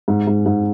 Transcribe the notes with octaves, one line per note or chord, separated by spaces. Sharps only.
G#2
G#2
G#2